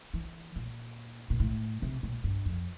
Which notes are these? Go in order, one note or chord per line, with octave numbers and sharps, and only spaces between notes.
E3
A#2
A#2
A2
C3
A#2
G2
F2